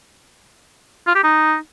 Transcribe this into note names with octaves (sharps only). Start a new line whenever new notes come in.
F4
G4
D#4